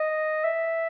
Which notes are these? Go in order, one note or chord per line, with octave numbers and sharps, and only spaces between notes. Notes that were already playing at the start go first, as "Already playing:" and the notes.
Already playing: D#5
E5